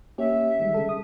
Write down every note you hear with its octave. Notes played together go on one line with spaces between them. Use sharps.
A#3 C#4 G4 E5
D#3 G3 G#3
C#3 G#3 A4
D#6